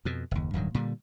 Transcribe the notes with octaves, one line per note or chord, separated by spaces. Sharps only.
F2 B2
F#1 D#2
D1 G2 D#3 F#3
A#2 D3 G3